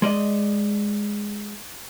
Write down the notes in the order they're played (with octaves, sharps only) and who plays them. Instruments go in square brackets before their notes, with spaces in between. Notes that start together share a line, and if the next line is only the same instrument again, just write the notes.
[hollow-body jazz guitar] G#3 D5 D#5